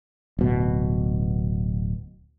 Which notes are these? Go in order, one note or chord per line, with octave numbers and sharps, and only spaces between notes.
D1 B2